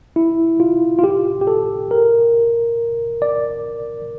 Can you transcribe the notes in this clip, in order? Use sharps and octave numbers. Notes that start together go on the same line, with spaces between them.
E4
F4
F4
G4
G4
A4
A#4
D5